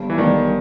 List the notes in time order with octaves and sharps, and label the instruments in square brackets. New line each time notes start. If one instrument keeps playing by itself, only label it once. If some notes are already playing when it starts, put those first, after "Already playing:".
Already playing: [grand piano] G1 G2 G3
[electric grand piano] E3
[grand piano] G1 G2 G3 [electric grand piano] D#3